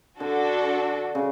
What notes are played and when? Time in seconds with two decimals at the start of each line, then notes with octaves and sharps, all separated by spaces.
0.20 D3 D4 F#4 A4
1.15 C#3